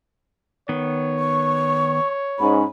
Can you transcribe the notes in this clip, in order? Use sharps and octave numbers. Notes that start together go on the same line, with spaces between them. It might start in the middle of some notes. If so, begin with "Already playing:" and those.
D#3 B3 C#5
C#6
G#2 C#4 B5